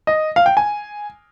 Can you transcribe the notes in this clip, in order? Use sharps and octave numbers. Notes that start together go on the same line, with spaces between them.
D#5
F5
G5
G#5